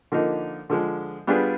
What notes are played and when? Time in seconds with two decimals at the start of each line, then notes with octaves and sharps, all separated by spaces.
0.12 D3 F3 A#3 D#4
0.70 D3 F3 G#3
1.27 G3 B3 D4 F4 G#4